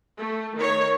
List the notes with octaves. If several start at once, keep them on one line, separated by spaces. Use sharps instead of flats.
A3
D#3 C#5